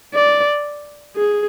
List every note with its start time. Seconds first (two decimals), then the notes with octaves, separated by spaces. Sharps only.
0.14 D5
1.16 G#4